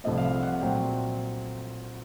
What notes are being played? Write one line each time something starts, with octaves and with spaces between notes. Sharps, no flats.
C2 C3 F3 A3 C4 D#5
F5
E5
F#5
A#2 F#3 A3 C4 G5